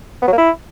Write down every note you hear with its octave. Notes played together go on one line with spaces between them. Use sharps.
B3
F#3
A#3
E4